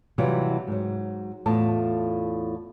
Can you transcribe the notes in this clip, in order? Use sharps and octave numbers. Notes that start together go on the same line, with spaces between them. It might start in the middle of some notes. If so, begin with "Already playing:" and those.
C3 E3 F#3 G3 F4
G#2 F#3
E2 A2 F4 A5